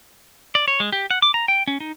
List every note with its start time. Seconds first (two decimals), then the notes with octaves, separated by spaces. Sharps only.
0.55 D5
0.68 C#5
0.80 G#3
0.92 G4
1.11 F#5
1.22 D6
1.34 A#5
1.48 G5
1.67 C#4
1.80 D#4